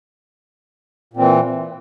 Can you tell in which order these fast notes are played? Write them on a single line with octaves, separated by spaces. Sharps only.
A#2 C4 E3